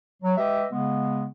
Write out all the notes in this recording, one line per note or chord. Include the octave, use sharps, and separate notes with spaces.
F#3
G#3 G4 B4 D#5 E5
C#3 G#3 B3